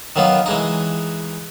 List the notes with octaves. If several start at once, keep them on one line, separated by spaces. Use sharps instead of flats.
D#3 F#3 B3 F4
E3 G#3 D#4